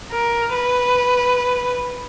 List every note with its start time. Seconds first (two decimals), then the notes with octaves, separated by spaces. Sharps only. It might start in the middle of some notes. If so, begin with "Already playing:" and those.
0.11 A#4
0.54 B4